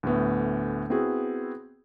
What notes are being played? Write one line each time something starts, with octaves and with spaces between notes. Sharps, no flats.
D2 A2 A3 B3
B3 C4 E4 F#4 G#4